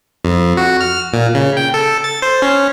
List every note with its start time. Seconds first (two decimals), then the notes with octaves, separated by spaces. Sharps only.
0.25 F2
0.57 F#4
0.81 F6
1.13 A#2
1.35 C#3
1.57 G5
1.74 A4
2.04 A6
2.22 C5
2.42 C#4